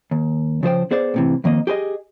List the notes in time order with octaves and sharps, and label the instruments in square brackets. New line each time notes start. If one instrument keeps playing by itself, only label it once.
[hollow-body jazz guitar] D#2
C#3 F3 C5 G5
B3 G#4 C5 D5
A2 C3 E3
F2 D#3 A#3 D#5
G4 G#4 B4 D#5